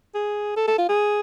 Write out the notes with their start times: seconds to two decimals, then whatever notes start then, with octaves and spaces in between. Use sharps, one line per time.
0.15 G#4
0.57 A4
0.68 A4
0.78 F4
0.89 G#4